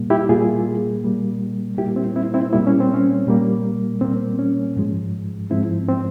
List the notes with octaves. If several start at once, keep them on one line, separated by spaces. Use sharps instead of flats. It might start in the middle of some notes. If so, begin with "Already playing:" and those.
Already playing: A#2 G3 A#3
E4 G4
A#2 G3 A#3 F4 G#4
A#2 G3 A#3
A#2 G3 A#3 E4 G4
C4 E4
C4 E4
C4 E4
A#2 G3 A#3 E4
C#4
C4
C#4
A#2 G3 A#3
A#2 G3 A#3 C4
C#4
G#2 F3 G#3
G#2 F3 G#3 C4 E4
C4